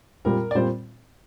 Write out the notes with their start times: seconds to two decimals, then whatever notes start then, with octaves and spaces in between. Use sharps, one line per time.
0.25 A#2 G3 C4 F4 A#4
0.51 D5
0.55 A#2 G3 C4 F4 C5